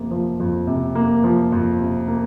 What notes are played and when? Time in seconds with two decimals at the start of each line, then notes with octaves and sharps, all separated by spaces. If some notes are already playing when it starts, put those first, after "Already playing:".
Already playing: F2 C3 A#3
0.11 F3
0.40 F2
0.67 C3
0.95 A#3
1.24 F3
1.52 F2
1.80 C3
2.08 A#3